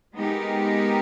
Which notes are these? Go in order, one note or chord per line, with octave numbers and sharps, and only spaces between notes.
G#3 B3 D#4 G4 A#4